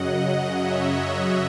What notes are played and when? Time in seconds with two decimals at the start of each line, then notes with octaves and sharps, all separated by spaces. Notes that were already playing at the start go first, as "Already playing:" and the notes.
Already playing: F#2 C#3 F#3 D#5 F#5
0.17 D#5 F#5
0.56 C#5 E5